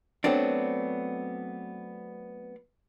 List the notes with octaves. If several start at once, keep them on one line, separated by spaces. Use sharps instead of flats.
F#3 A3 B3 C4 D4